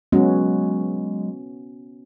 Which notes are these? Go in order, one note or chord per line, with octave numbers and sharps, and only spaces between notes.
F#3 G#3 B3 C#4 F#4